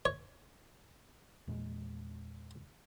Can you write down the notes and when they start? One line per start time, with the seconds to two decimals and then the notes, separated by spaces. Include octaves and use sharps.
0.05 C#5
1.48 E2 A#2 G#3